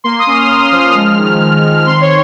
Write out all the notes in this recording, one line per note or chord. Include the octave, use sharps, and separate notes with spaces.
A#3 C6
D#6
C#4
F6
A#3 F6
F3 F6
G#3
D#3
G#3
D#3
C4 C6
C#5